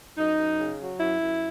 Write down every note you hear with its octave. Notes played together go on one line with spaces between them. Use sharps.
F#2 D#4
F#2
C#3
F#3
F#2 E4
F#2